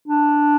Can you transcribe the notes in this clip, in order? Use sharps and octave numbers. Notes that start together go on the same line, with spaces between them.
D4